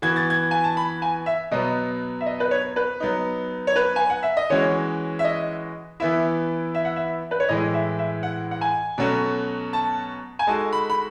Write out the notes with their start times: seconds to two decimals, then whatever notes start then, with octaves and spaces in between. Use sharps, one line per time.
0.02 E3 B3 F#4 G#6
0.16 A6
0.30 G#6
0.51 G#5
0.64 A5
0.77 B5
1.02 G#5
1.26 E5
1.51 B2 F#3 B3 D#5
2.21 E5
2.26 D#5
2.40 B4
2.51 C#5
2.76 B4
3.00 F#3 B3 D#4
3.67 C#5
3.76 B4
3.96 G#5
4.10 F#5
4.23 E5
4.37 D#5
4.50 E3 G#3 C#4 F#4 C#5
5.19 E5
5.24 D#5
6.00 E3 B3 E4 E5
6.75 E5
6.85 F#5
6.96 E5
7.31 B4
7.40 C#5
7.48 A2 E3 G#3 D#5
7.74 E5
7.99 E5
8.23 F#5
8.51 F#5
8.61 G#5
8.98 B2 F#3 A3 C#4 F#4
9.73 A5
10.39 G#5
10.47 G#3 D#4 F#4 A4 A5
10.73 B5
10.90 B5